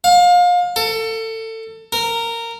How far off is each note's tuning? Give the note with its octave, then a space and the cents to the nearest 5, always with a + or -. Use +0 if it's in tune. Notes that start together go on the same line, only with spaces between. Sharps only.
F5 +30
A4 +25
A#4 -15